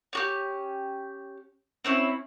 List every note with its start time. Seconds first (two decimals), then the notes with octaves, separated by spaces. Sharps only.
0.13 C#4 F#4 G4
1.85 C4 C#4 E4